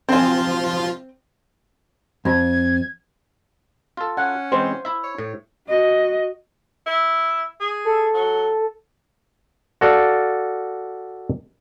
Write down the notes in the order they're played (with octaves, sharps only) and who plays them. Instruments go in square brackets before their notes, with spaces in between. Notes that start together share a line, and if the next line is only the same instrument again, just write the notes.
[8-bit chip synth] F3 F4 [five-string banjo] C4 G#5
[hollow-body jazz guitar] F2 [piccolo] G#6
[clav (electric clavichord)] F4 A4
[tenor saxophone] C#4 [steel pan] F#5
[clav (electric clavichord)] E3 G#3 C4 [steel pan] C5
[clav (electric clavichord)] E4 E5
[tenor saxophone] C#5
[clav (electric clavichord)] A2
[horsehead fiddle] F#4 D#5
[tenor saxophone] E4
G#4
[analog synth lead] A4
[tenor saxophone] F#3
[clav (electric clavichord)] F#4 A4 D5 F5